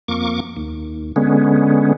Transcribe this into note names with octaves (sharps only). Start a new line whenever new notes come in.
F2 A#3 C#6 D6
D#2
D3 G#3 B3 C#4